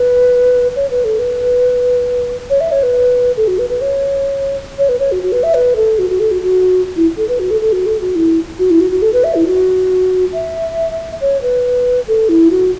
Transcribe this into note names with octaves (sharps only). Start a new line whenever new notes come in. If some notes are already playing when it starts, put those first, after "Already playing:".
Already playing: B4
C#5
B4
A4
B4
C#5
E5
C#5
B4
A4
F#4
B4
B4
C#5
C#5
B4
C#5
F#4
F#4
B4
E5
B4
A4
F#4
F#4
A4
F#4
F#4
E4
A4
B4
F#4
A4
A4
F#4
A4
F#4
E4
F#4
E4
F#4
F#4
A4
B4
E5
E4
F#4
E5
C#5
B4
A4
E4
F#4